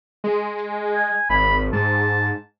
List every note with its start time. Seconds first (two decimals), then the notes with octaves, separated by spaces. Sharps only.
0.24 G#3
0.94 G#5
1.30 G#1 B5
1.73 G#2 A5